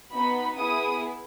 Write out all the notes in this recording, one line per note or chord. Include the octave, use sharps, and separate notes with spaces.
B3 D#4 F#4 B5
B3 E4 G#4 D#6